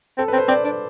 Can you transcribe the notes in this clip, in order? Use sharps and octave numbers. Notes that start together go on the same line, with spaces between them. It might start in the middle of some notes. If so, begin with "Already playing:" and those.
C4 A4
B4
C4
C5
C4 D5
D4